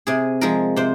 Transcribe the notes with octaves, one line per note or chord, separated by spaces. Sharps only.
C3 G#4
F3 G#3 A#4
C3 C5